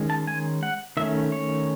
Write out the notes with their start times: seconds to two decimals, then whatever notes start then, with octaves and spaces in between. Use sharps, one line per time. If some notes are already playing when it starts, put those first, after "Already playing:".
Already playing: D#3 G#3 C#4
0.10 A5
0.27 G#5
0.63 F#5
0.97 D#3 A3 C#4 E5
1.32 C#5